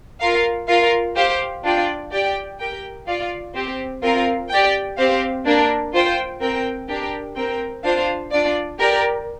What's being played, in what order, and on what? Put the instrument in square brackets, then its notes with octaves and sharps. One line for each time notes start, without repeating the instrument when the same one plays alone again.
[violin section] F4 A#4 F5
F4 A#4 F5
G4 C5 F5
D4 F4 D5 G5
G4 D5 G5
G4 A#4 G5
F4 D5 F5
C4 G4 C5
C4 F4 A#4 F5
G4 D5 G5
C4 G4 C5 F5
A#3 D4 A#4
F4 C5 G5
C4 A#4 G5
D4 G4 A#4 G5
C4 A#4 G5
D4 F4 C5 F5
D4 F4 D5
G4 A#4 D5 G5